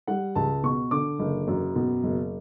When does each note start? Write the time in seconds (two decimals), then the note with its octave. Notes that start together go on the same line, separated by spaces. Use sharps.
0.07 G3 F#5
0.35 C#2 A5
0.63 B2 C#6
0.91 D3 D6
1.19 F#1
1.48 F#2
1.75 B2
2.04 F#1